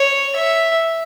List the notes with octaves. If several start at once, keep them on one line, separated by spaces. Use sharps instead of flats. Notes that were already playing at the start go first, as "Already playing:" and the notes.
Already playing: C#5
E5